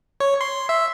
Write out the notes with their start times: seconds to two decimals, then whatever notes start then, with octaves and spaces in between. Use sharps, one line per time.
0.20 C#5
0.41 C6
0.69 E5